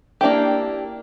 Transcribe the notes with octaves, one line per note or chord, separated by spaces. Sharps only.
A#3 D4 E4 G4